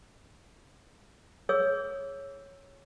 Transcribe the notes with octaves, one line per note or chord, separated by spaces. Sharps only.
G#4 C#5 E6